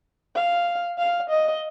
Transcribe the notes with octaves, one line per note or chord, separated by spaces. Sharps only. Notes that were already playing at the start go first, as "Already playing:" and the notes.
F5
F5
D#5